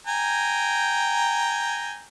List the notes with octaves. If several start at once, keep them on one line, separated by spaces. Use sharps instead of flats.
G5 G#5 A#5